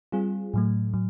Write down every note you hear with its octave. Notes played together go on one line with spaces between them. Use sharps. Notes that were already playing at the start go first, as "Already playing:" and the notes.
G3 C4 F4 G#4
A2 F#3 A3
A2 F#3